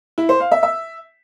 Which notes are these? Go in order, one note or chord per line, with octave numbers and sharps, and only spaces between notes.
E4
C5
F5
E5
E5